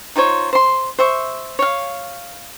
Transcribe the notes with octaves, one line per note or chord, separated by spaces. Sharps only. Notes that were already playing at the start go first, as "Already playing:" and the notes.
D#4 F4 C5 C#5
C5 C6
C5 E5 C#6
C#5 F5